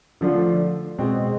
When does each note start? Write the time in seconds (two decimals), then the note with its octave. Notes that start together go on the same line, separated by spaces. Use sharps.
0.21 D3 F3 A3 D4 F4
0.99 B2 G#3 C4